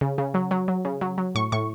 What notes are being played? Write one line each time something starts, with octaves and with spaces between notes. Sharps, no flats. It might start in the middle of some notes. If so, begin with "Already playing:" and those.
C#3
C#3
F#3
F#3
F#3
C#3
F#3
F#3
A2 C#6
A2 C#6